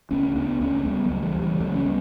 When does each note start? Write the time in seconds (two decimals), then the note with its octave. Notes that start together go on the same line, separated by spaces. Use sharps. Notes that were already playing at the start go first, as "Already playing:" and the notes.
0.11 C#2 A3 C#4
0.35 C#2 B3 D4
0.61 C#2 A3 C#4
0.85 C#2 G3 B3
1.04 F#3 A3
1.10 C#2
1.22 E3 G3
1.35 C#2
1.41 E3 G3
1.60 C#2 F#3 A3
1.75 C#4
1.85 G3 B3